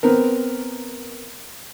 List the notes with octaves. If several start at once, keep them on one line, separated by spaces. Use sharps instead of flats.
B3 C4 A#4